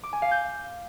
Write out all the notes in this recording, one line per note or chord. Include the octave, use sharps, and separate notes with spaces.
D6
G#5
F5
G6